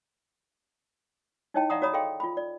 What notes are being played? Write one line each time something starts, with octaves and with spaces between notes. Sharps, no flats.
D#4 E4 C#5 D#5 G5 A5
D5 F5 F#5 A#5 C6 D#6
F#4 C#5 D5 A#5 B5 D#6
G#4 A4 D#5 F5 G5 C6
F4 B5
D5